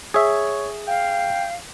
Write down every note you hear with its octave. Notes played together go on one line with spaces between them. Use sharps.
G#4 C#5 E5
F5 G5